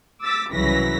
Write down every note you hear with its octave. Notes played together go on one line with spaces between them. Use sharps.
D6 E6 A6 B6
C2 C#3 E3 F#3 A#6 B6